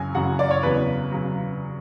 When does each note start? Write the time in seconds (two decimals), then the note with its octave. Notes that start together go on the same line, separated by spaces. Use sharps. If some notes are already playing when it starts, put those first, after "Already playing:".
Already playing: F#2 C#3 F#3 G#5
0.15 F#2 C#3 F#3 F#5
0.39 D5
0.51 C#5
0.63 E2 C#3 F#3 B4
1.12 C#3 F#3